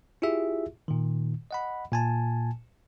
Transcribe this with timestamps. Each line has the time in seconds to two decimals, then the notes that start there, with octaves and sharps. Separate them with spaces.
0.22 E4 F4 G4 G#4 E5
0.88 A#2 D#3
1.51 D#5 F#5 B5
1.92 A#2 G#5 A5